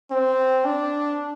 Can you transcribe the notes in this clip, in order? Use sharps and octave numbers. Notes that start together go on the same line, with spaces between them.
C4
D4